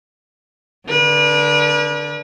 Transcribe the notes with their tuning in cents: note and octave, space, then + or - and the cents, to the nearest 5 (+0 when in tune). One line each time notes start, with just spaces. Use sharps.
D3 +0 B4 -40